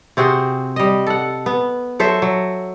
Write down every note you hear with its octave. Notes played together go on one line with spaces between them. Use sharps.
C3 C4 F#4 G#4
G3 D#5
A4 F#5
B3
F#3 A4 C5 E5
F#3